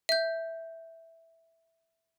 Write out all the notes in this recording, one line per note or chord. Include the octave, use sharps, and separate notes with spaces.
E5 G6